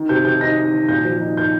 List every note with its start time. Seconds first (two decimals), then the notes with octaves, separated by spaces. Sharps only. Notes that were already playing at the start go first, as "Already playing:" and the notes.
Already playing: D#3
0.09 C3 G6
0.25 C3 G6
0.41 D#4 A#6
0.57 D#4
0.74 D#3
0.88 A#2 G6
1.05 F3
1.21 D#4
1.37 D#4 G6